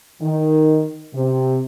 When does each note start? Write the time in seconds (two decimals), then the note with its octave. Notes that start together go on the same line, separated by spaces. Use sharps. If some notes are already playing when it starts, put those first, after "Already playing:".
0.22 D#3
1.14 C3